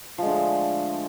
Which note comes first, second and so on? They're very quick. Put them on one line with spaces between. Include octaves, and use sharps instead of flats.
F3 G#3 D3 A3